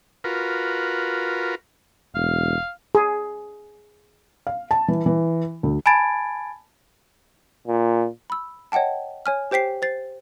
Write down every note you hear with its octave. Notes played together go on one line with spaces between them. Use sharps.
F4 F#4 A#4 B4
E1 F5
G#4
F5
A5
E3
E3
D2
G#5 A5 B5 G#6 A6 D7
A#2
B5 E6
C#5 D#5 F#5 G5 A5
C#5 G#5 F6
G4 C5 G5 B6 C7
C5 A6 C7